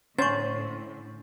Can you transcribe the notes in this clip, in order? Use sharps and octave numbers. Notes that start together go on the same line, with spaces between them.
A2 D3 C#4 C5 C#6 A6